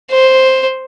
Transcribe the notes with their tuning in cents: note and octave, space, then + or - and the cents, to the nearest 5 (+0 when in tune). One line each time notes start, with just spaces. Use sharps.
C5 +5